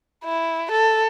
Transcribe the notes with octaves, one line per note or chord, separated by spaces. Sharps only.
E4
A4